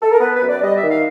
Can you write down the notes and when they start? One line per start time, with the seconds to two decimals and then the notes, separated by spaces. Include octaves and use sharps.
0.02 A4
0.12 A#4
0.20 B3 B4
0.35 B4
0.42 F#2
0.48 D5
0.62 G3 D#5
0.76 E5
0.83 D#3
0.90 F5